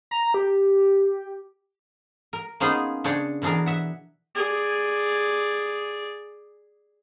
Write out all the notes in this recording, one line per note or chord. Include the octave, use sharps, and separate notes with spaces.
A#5
G4
A#4
A#3 B3 C#4 D#4 F4 G#4
C#3 D4 G#4 C#5 G5
B2 E3 D4 G#4 A#4
E5 F#5
G#4 D5